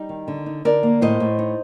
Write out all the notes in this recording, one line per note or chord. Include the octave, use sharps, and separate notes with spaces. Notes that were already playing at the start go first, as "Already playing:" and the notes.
Already playing: G3 D#4
D#3
D3
D#4
D3 A#4 D5
A#3
A2 C5 D#5
A2
D#4